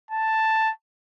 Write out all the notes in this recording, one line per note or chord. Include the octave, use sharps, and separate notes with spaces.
A5